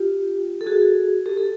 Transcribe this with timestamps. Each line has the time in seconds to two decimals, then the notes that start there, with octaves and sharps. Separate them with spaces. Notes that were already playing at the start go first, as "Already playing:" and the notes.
Already playing: F4 G4
0.61 A4
0.66 F#4 G#4
1.26 G4 A4
1.37 A4